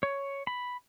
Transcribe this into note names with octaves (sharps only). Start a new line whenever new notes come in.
C#5
B5